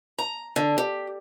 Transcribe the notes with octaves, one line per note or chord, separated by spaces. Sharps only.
A#5
D3
G4